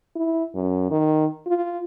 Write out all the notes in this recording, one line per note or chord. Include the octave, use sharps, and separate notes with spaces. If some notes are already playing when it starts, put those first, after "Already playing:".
E4
F#2
D#3
F4